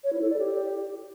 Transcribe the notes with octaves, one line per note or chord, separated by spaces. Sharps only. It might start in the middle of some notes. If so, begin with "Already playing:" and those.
C#5
E4
A4
D5
G4